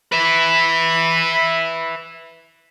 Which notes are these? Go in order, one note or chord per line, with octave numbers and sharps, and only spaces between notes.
B4 E5 B5